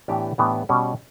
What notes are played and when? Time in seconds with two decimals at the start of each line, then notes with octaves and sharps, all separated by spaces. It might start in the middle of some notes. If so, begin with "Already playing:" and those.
0.08 A2 E3 B3 D4 G4
0.38 A2 E3 B3 D4 G4
0.69 B2 G3 C#4